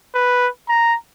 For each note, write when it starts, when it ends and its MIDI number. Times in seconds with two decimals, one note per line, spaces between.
0.14 0.48 71
0.68 0.96 82